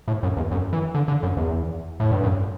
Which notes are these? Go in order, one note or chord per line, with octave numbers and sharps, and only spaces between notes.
A2
F#2
E2
F#2
E3
D3
D3
F#2
E2
A2
G2
F#2